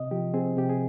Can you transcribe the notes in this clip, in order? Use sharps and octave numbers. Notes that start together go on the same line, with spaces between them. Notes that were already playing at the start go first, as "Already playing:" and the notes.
Already playing: C3 D#5
F3 G4
C4 G#4
C3 G4
G#4